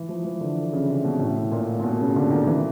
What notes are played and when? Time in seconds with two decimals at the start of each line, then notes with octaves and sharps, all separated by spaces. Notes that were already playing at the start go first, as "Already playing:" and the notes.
Already playing: E3
0.09 F3
0.24 E3
0.41 D3
0.73 C#3
0.88 C3
1.05 B2
1.20 A2
1.52 A#2
1.79 A#2
1.83 B2
2.00 C#3
2.16 D3
2.31 D#3
2.47 E3